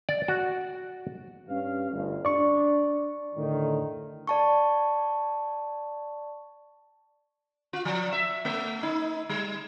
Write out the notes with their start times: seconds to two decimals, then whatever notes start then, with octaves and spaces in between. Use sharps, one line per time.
0.09 D5
0.28 F#4
1.48 G2 C#4 F5
1.91 G1 D2
2.25 D4 D5 C#6
3.35 A2 D3 D#3
4.27 D5 A5 C#6
7.73 F4
7.85 F3
8.13 E5
8.45 A3
8.83 D#4
9.29 G3